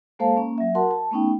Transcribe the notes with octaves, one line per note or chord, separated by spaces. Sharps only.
G#3 A#3 A4 C5 F5 A5
A#3 C#4
F#3 E5
F#4 A#4 F#5 A5 C6
A5
A3 B3 C#4 D#4 G5